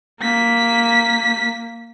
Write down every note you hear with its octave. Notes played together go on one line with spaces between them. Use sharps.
A#3 B6